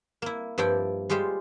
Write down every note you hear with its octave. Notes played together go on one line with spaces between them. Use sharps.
A#3 E4
G2 F3 E4 D5 G5
G3 G#3 F4 G4 C5